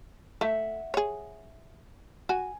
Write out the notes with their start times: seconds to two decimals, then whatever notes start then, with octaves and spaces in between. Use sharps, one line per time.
0.41 A3 E5 F#5
0.94 G#4 C#5
2.29 F#4 G#5